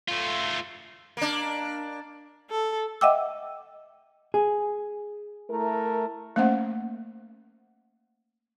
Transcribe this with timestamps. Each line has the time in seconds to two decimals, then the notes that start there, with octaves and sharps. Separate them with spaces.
0.08 A3 F4
1.17 A#3 D4
2.50 A4
3.01 D#5 E5 F#5 G5 D6 E6
4.34 G#4
5.50 A3 E4 A#4
6.36 A3 A#3 C#4 C5 E5 F#5